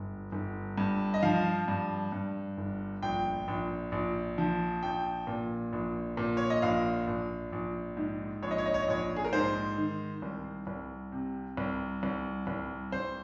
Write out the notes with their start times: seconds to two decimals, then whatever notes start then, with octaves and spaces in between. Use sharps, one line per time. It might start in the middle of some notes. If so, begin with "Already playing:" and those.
Already playing: G1
0.32 G1
0.78 G2
1.14 D#5
1.22 F3 F5
1.68 G2
2.12 G2
2.58 G1
3.03 A#1 G5
3.48 A#1
3.92 A#1
4.38 F3
4.83 A#1 G5
5.27 A#2
5.73 A#1
6.17 A#2
6.37 C#5
6.50 D#5
6.62 A#1 F5
7.07 A#1
7.52 A#1
7.97 G#2
8.42 A#1 C#5
8.51 D#5
8.58 C#5
8.66 D#5
8.74 C#5
8.82 D#5
8.88 A#1 C#5
9.16 G#4
9.25 A#4
9.33 G#2 C5
9.78 D#3
10.22 C2
10.67 C2
11.12 C3
11.57 C2
12.03 C2
12.47 C2
12.92 C2 C5